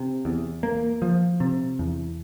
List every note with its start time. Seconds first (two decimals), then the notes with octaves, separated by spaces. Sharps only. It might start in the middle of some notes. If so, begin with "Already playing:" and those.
Already playing: C3
0.25 E2
0.63 A#3
1.02 F3
1.40 C3
1.79 E2